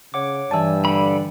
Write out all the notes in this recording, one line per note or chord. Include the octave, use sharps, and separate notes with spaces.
C#3 C#5 F#5 D6
G2 E3 D5 G#5 A5 E6
D3 B5